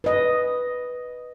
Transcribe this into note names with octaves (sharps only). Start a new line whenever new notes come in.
B4 D#5